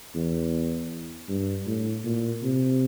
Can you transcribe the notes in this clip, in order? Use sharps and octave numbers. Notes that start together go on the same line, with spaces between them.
E2
G2
A2
A#2
C3